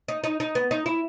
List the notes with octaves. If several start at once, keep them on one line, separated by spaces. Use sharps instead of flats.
D#4
D#4
D#4
B3
D#4
E4